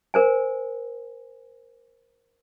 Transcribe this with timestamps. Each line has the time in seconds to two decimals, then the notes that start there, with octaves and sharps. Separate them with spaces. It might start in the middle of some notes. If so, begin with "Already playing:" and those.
0.14 A#4 C5 G#5